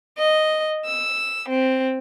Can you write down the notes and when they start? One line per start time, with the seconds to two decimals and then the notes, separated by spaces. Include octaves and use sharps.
0.18 D#5
0.85 E6
1.50 C4